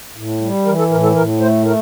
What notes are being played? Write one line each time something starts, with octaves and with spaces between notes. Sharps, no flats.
A2
G3
E3 A#4
A4
A2 A#4
A4
A2 A#4
A3 C5
A3 A#4